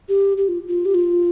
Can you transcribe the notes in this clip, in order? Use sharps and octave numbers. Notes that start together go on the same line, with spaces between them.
G4
G4
F4
F4
G4
F4